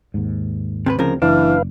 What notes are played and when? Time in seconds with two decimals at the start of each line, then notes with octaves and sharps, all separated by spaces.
0.14 D#2 G#2
0.86 C3 G#4 B4
0.99 D2 C#3 F3 C4 A#4
1.22 F#1 E3 D4 B4 F5